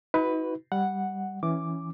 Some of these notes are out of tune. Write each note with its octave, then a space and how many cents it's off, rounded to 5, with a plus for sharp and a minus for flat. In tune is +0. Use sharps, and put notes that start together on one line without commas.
D#4 +45 F#4 +0 B4 +5
G3 +0 F#5 +0
E3 +0 C#4 +5 D6 +0